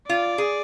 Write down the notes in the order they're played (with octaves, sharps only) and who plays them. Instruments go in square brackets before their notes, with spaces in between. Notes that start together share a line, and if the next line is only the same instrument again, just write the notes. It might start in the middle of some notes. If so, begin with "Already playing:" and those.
[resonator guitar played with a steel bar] F4 [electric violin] D5
[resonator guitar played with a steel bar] G#4